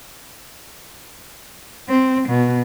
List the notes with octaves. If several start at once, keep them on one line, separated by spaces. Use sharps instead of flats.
C4
B2